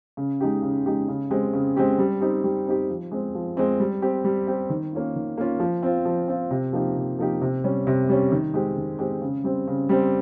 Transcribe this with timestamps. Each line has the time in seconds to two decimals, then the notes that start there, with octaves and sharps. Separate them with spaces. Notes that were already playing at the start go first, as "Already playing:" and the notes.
0.17 C#3
0.40 G#3 D#4 G4
0.62 C#3
0.86 G#3 D#4 G4
1.08 C#3
1.30 G#3 C4 G4
1.54 C#3
1.76 G#3 C4 G4
1.99 G3
2.21 C4 D#4 G4
2.44 G3
2.67 C4 D#4 G4
2.90 F3
3.11 G#3 C4
3.35 F3
3.57 G#3 C4
3.80 G3
4.02 C4 G4
4.24 G3
4.47 C4 G4
4.70 D#3
4.93 A#3 C#4 F4
5.16 D#3
5.37 A#3 C#4 F4
5.60 F3
5.83 C4 F4
6.05 F3
6.28 C4 F4
6.51 C3
6.73 F3 A#3 D#4 G4
6.96 C3
7.18 F3 A#3 D#4 G4
7.42 C3
7.64 G3 C#4
7.87 C3
8.09 G3 C#4
8.32 D#3
8.54 G#3 C4 G4
8.77 D#3
8.99 G#3 C4 G4
9.22 C#3
9.44 G3 C4
9.68 C#3
9.89 G3 C4